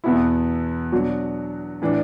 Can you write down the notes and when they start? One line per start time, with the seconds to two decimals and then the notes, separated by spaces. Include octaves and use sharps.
0.04 E2 B2 B3 E4
0.92 B2 F#3 D4 F#4
1.82 A2 E3 D4